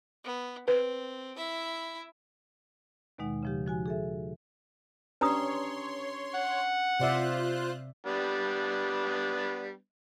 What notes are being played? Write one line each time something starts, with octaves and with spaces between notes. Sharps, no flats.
B3
C4 B4
E4 E5
D#2 B2 D#3 G#3 D#4 F#5
C#3 F3 G4
F3 F#4 G#5
G#4 A4 E5
C#4 D4 G4 B4 C#5 A#5 C6 D#6
F#5
C3 F4 C5 D5 E5 F#6
G3 B3 D4